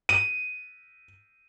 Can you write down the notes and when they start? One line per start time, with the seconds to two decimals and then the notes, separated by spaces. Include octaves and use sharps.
0.09 D#7